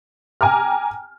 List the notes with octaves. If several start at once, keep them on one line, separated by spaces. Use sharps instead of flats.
G5 G#5 A#5 D6 F6